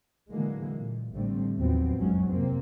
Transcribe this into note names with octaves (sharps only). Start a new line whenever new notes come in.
A2 D3 E3 F#3 G#3 A#3
A#2
A1 A2 D3 G3 A3 C4
D#2 A2 F3 F#3 B3 C4
F#1 B1 F2 F#3 G#3 C#4
C3 A#3 C4